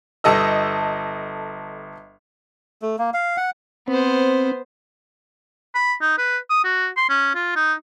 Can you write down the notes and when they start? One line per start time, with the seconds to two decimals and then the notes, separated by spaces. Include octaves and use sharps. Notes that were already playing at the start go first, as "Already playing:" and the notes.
0.24 G1 A4 D#5 E6
2.82 A3
2.98 A#3
3.14 F5
3.37 F#5
3.88 B3 C4 C5
5.75 B5
6.02 D#4
6.18 B4
6.50 D#6
6.64 F#4
6.97 C6
7.09 C#4
7.35 F4
7.56 D#4